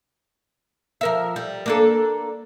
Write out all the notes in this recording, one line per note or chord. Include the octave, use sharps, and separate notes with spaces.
F3 A#4 E5
G3
A#3 D4 A4